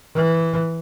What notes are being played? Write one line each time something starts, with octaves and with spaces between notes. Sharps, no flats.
E3